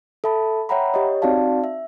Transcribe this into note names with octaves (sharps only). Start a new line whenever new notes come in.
A4 E5 A5 B5
C#5 E5 F#5 G5 A#5 B5
G4 C#5 D#5
C4 D#4 F#4 D5 F5 A5
E5